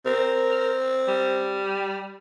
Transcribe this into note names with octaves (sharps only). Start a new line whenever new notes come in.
C4 A#4
G3